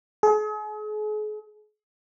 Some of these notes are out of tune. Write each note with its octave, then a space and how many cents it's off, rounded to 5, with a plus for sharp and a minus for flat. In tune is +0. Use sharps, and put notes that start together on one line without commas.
G#4 +40